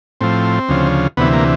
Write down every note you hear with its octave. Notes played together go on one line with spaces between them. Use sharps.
A2 F3 C4
D2 C#3 F3
D2 C3 E3 B3
A#3